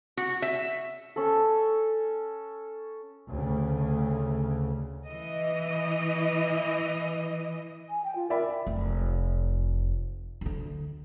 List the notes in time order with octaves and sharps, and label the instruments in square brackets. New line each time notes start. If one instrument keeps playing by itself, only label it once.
[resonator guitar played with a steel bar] F#4
E5
[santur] C#4 A4
[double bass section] D2 C#3
[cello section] E3 D#5
[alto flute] G#5
G5
F4
[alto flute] A#4 [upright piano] D5 E5 B5
[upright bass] F1
D2 D3